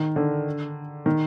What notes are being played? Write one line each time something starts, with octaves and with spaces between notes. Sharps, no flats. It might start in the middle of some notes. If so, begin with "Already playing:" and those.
Already playing: D#3
D3
D#3